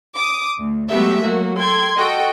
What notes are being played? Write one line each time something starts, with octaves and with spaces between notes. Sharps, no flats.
D6 D#6
D2
F#3 G#3 A3 B3 G4 E5
F#3 A#3 F#4
A4 G5 C6 G#6
F#4 A4 D#5 G5